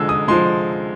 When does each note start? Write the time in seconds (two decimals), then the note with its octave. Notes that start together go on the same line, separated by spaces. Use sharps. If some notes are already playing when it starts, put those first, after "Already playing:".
Already playing: D3 F3 G#3 E6
0.09 D#6
0.28 F3 G#3 C6